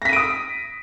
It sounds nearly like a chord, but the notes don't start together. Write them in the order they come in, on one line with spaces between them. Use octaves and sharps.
A#6 B6 D#7 D7 D#6